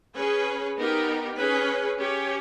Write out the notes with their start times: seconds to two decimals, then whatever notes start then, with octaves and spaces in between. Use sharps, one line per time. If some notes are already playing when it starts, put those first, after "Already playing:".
0.16 C#4 G#4 B4
0.77 B3 D#4 G4 A#4
1.38 C#4 G#4 B4
1.99 C#4 G4 C#5